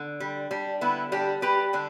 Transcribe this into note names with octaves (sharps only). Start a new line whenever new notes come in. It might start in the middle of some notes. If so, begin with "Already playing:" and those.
Already playing: D3
G3
G3 D4
D3 B3 E4
G3 D4 G4
G3 G4 B4
D3 D4